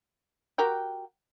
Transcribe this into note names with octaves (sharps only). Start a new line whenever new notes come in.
F#4 G4 A#4 G5